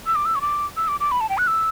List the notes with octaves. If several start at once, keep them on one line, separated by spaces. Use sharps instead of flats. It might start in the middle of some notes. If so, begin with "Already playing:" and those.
E6
D6
E6
C#6
D6
E6
D6
D6
B5
A5
G5
F#6
E6